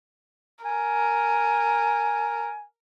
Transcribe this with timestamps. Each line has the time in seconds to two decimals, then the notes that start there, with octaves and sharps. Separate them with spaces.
0.65 A#4 G#5